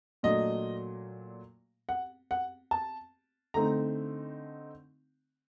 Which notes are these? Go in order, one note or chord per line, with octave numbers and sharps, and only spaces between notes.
A#2 F#3 A3 D4 D#5
F#5
F#5
A5
D3 A3 C4 D#4 A#5